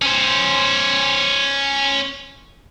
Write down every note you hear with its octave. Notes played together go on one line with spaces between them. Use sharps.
C#4 C5